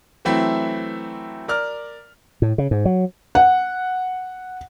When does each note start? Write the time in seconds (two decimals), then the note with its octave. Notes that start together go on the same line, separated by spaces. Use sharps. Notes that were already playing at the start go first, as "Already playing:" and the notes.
0.25 E3 F#3 A3 C4 E4
1.48 A#4 D5 F6
2.42 A2
2.58 C#3
2.71 G#2
2.85 F#3
3.35 F#5